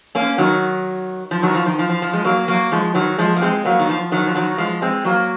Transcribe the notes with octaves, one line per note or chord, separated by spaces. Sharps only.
A#3 C#4
D#3 F#3
F3
D#3 F#3
F3
D#3
F3
F3
F3
F3 G#3
F#3 A#3
F#3 A#3
F3 G#3
D#3 F#3
F3 G#3
A#3
G#3 C4
F#3 A#3
D#3
F3
D#3 F#3
F3
D#3 F#3
F3 G#3
G#3 C4
F#3 A#3